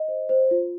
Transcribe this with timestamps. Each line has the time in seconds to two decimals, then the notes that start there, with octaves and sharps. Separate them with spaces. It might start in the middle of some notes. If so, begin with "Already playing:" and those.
Already playing: D#5
0.08 C5
0.29 C5
0.51 F4